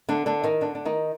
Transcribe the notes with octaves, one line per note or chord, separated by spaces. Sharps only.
D3 D4
D3 D4
D#3 D#4
D3 D4
D4
D#3 D#4